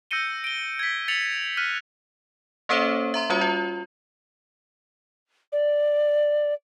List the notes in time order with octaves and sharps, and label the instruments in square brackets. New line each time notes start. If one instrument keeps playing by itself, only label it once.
[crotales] E6 G6 A#6 C#7 D#7 G7
D7 G7
G#6 B6
A6 C#7 F7 F#7
F6 F#6 B6 D#7
[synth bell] A#3 C#4 A4 C5 C#5 E5
E5 A#5 C6
G3 C#4 F4 F#4 C#5 E5
F4
[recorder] D5